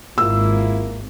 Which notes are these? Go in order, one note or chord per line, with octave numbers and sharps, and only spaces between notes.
G#1 A#3 E4 F4 E6